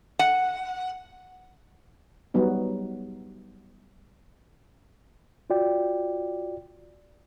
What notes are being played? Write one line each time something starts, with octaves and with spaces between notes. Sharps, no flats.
F#5
F#3 G3 B3 D#4
F4 F#4 D5 G5